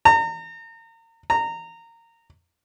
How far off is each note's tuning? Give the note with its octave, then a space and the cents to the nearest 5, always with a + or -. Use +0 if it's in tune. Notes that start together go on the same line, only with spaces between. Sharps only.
A#5 -35
A#5 -20